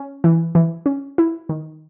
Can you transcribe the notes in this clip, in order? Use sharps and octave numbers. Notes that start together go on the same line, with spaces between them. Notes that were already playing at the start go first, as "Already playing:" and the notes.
Already playing: C#4
E3
E3
C#4
E4
D#3